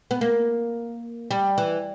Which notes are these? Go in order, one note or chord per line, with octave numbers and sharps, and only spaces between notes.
B3
A#3
G3
E3